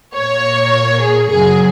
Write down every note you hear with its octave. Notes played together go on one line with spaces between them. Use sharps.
A#2 A#3 C#5
G#4
F#2 C#3 F#3 G#4